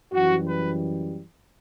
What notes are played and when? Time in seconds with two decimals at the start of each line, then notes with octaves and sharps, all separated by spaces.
0.12 F#2 E3 G3 F#4
0.46 B4